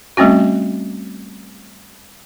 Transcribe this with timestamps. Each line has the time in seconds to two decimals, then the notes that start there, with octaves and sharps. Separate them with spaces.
0.17 G3 A3 C4 C#4 F#4